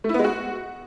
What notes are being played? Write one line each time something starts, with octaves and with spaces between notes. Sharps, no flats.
A3
E4
B3
G#3
F#4